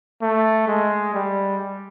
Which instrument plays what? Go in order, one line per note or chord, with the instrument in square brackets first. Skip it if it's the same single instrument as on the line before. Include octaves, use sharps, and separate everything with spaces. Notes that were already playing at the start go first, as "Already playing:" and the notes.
[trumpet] A3
G#3
G3